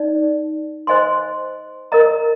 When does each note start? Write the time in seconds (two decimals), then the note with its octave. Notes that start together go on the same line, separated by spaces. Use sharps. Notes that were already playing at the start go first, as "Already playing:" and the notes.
Already playing: D#4 D5
0.87 C5 D#5 G#5 C6
1.92 A#4 D#5 A#5